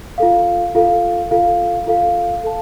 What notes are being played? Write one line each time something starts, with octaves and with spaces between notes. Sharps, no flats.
F4 A4 F5
F4 A4 F5
F4 A4 F5
F4 A4 F5
A4 F5 A5